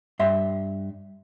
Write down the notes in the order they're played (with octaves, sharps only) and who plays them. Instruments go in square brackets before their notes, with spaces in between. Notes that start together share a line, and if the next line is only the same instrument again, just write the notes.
[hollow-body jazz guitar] G2 E5 C6